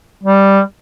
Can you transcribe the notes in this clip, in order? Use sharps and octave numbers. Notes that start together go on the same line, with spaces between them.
G3